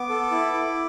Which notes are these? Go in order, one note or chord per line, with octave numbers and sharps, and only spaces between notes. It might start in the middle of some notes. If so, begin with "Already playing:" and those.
Already playing: B3 D6
A4
E4
E4